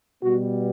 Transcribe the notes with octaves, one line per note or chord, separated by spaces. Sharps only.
B2 G3 B3 F#4